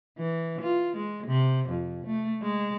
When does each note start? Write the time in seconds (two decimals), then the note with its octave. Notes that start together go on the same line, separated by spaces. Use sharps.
0.18 E3
0.61 F4
0.97 G#3
1.27 C3
1.69 F2
2.06 A3
2.42 G#3